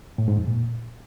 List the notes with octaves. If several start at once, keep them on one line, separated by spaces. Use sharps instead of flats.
A2
G#2
F2
A#2